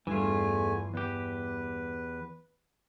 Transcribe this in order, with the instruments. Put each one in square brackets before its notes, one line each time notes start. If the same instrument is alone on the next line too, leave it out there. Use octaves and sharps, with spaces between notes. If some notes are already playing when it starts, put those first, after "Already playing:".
[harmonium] E2 A3 G#5 [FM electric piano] G2 [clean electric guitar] E3 F4
[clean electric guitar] E2 G4 [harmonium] B4